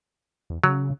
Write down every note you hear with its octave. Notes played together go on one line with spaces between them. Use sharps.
E2
C#3 F#3